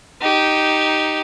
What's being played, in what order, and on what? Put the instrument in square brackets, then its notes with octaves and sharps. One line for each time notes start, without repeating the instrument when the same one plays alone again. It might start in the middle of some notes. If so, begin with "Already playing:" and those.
[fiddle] D#4 G4